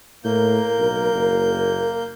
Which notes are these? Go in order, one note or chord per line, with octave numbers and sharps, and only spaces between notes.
A2 A#3 A#4 G6
B1
F#1